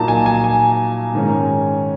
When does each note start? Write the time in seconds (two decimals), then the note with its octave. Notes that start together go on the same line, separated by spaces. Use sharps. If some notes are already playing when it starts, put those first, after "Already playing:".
Already playing: A#2 F#3 A#3 D#4 A5
0.08 G#5
0.26 G#5
0.44 G#5
1.14 G#2 D#3 G#3 C#4